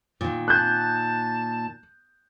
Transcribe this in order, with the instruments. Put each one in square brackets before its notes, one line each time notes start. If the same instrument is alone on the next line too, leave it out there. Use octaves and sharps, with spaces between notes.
[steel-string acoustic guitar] A#2 D#3
[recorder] A5 [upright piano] F#6 G6